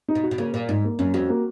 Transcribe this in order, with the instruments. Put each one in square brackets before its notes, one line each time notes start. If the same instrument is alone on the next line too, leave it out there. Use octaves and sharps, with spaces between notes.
[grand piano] D#4
[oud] B2
[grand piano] F#4
[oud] B2
[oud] C#3 [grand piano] A#3
[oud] A#2 [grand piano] A#4
[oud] G#2 [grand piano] D#4
[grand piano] A#3
[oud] F#2 [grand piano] C#4
[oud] F2 [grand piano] F#4
[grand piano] A#3